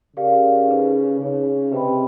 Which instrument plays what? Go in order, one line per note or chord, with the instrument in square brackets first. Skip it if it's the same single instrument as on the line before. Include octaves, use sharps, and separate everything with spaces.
[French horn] C#3 [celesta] G4 A#4 D5 F5
[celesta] D#4 G#4 B4
[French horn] C#3 [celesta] D#4 G#4 C#5
[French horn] C3 [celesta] G4 B4 D#5 G5 B5